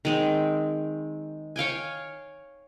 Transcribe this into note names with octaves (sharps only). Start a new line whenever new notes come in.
D#3 G#3 C4
C#5 F5 G5 G#5